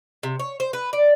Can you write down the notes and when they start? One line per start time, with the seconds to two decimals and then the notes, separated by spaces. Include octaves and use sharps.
0.23 C3
0.40 C#5
0.60 C5
0.73 B4
0.93 D5